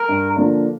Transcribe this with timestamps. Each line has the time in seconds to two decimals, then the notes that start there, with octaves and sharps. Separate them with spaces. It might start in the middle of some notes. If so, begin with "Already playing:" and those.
Already playing: A#4
0.08 G2
0.36 D3 F3 A#3 D4